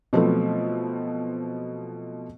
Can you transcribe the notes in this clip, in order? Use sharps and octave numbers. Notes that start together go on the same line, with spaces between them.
B2 F3 F#3 A3 B3 C4